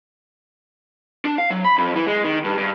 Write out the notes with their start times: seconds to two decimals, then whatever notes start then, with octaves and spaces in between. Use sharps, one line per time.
1.25 D4
1.38 F5
1.50 F#3
1.65 B5
1.78 F2
1.95 E3
2.07 G#3
2.24 D#3
2.44 G2
2.58 G2